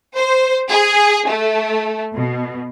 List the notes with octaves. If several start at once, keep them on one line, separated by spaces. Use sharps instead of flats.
C5
G#4
A3
B2